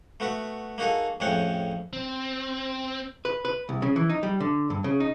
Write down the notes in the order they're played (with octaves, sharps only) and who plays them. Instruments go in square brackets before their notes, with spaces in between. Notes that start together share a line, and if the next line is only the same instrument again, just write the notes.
[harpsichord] A3 B3 F#4 E5
A#3 D#4 F#4 G#4 A4
F2 A2 C#4 G#4 F#5 G5
[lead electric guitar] C4
[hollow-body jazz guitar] B4
B4
C2
C#3
E3
D#4
G3
D3
G2
C#3
D#4